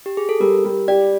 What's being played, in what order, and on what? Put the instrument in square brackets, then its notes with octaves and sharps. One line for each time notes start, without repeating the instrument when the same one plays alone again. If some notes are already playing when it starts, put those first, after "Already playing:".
[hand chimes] G4
G#4
A4
[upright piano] G3 [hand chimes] A#4
[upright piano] G3
[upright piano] G4 [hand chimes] D5